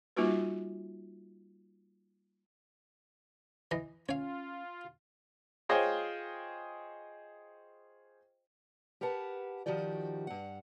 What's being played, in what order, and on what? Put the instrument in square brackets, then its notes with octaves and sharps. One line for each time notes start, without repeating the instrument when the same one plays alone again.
[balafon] G3 A#3 D#4 F4 F#4 B4
[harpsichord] E3 D#5
[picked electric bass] C#4 [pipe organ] F4 [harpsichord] C#5 F5
[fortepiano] F4 G#4 C5 C#5 D#5 G5
[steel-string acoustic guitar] G4 A#4 B4 F#5 A5
D#3 F3 F#4 G4 D5
G2 F#5